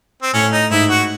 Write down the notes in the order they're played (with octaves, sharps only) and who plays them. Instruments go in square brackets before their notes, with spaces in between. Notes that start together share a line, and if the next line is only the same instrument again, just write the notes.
[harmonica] C4
[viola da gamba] A2 [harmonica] C#4
[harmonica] D#4
[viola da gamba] G#2 [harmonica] E4
[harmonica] F#4